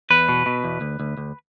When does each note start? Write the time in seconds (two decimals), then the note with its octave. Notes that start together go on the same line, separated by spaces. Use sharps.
0.10 E2 B4
0.29 B2
0.46 B2
0.64 E2
0.81 D2
1.00 D2
1.17 D2